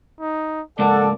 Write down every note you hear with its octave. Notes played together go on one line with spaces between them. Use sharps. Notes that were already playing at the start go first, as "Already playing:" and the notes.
D#4
C#2 G#2 A#3 A4 D5 F#5